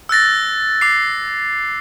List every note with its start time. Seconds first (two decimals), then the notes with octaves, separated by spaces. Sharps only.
0.09 E6 F#6 A6 A#6
0.81 D6 C7